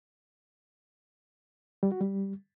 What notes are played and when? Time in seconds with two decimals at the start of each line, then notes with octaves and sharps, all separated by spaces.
1.83 G3
1.92 F#4
2.00 G3